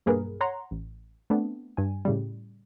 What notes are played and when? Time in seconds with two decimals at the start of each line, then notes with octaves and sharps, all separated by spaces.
0.06 B1 G2 A#3 G#4 A#4 B4
0.41 C#5 F#5 A#5 C6
0.71 A1
1.30 A3 B3 C4 D4
1.77 G2 G#5
2.05 A2 C#3 G3